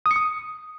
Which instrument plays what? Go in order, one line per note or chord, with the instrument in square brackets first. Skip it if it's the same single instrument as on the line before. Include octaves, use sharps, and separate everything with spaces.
[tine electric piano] D#6
C#7
D#6